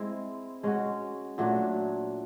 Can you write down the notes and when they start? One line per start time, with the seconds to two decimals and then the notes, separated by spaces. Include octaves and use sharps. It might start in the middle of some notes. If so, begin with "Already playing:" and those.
Already playing: G#3 C4 E4
0.63 G#3 C#4 F#4
1.38 A#2 F#3 A3 D4